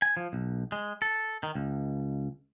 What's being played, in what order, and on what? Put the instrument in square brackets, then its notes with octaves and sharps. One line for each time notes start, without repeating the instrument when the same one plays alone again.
[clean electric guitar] G#5
F3
B1
G#3
A4
D#3
C#2